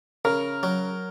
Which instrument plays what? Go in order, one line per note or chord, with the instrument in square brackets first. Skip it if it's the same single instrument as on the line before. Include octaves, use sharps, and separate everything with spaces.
[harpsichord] C#3 [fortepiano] A#4
[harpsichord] F#3